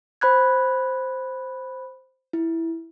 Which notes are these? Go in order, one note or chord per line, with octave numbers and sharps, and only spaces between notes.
C5 B5 F#6 G#6
E4